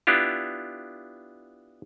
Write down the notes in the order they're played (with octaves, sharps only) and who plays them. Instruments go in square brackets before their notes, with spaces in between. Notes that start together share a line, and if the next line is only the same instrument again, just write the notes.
[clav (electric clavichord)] B3 D4 E4 F4 G4